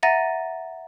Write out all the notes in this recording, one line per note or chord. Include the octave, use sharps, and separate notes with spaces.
E5 F#5 A#5 A6 A#6 D#7